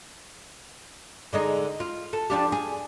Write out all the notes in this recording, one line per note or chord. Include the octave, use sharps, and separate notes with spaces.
D3 G#3 D#4
F4
A4
F3 D4 G4
G#4